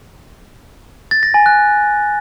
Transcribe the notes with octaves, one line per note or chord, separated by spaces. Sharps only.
A6
A#6
G#5
F#6